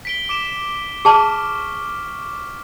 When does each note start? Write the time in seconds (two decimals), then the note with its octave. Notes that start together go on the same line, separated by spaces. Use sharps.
0.05 B6 D7 G7
0.29 D6 D7 E7
1.05 G#4 A5 C#6 D6 F6